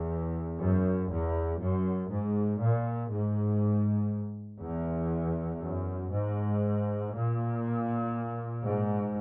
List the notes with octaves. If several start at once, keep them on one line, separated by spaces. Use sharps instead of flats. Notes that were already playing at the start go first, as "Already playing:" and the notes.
Already playing: E2
F#2
E2
F#2
G#2
A#2
G#2
E2
F#2
G#2
A#2
G#2